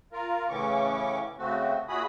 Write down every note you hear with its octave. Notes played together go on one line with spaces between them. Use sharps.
F4 A#4
A2 C#3 E3 C#4 C#6 D6
C#3 A3 C4 F#4
A#2 E4 F#4 G#4 B5 D#6